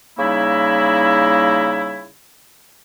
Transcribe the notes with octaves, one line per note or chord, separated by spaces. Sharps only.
C#3 G3 A#3 D#4 E4